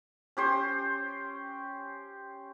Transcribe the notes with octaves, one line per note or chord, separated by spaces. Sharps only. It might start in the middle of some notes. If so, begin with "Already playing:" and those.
C#4 G4 C5